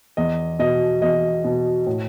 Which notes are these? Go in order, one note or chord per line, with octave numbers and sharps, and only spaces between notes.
E2 D#5
B2 D#5
E2 D#5
B2
A2